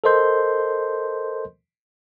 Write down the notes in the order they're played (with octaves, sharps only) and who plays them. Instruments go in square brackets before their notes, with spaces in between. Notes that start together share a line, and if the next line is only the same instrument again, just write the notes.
[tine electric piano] A4 A#4 C5 D#5 C6 G6